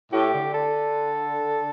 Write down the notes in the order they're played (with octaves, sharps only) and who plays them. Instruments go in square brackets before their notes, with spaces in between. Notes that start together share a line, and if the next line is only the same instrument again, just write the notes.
[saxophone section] A2 [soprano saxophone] G4
[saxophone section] D3
[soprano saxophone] A4